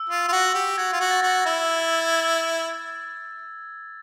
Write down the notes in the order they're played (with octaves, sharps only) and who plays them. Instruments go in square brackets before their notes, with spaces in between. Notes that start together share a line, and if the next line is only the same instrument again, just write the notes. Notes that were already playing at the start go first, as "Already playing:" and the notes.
Already playing: [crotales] E6
[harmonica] F4
F4
F#4
G4
[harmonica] F#4 [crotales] G#6
[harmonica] F4
F#4
[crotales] A6
[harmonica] F#4
[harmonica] E4 [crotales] G#6